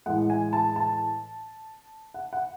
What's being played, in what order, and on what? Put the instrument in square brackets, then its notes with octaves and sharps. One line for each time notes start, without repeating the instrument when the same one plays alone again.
[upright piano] A2 E3 G#3 F#5
G#5
A5
A5
F#5
F#5